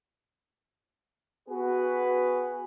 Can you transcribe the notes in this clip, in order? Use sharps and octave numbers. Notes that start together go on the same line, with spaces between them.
B3 F#4 G#4 B4